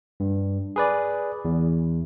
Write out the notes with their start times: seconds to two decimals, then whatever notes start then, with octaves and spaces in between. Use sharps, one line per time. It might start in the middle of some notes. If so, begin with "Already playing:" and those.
0.20 G2
0.76 G#4 B4 D5
1.45 E2